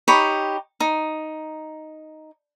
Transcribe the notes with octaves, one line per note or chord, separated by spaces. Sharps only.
D#4 G4 C#5 B5
D#4